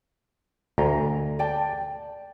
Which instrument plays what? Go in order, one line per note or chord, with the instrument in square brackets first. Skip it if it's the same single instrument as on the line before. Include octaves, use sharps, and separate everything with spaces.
[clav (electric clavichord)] D2 [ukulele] A#4 D#5 A#5
[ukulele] D5 G5 A5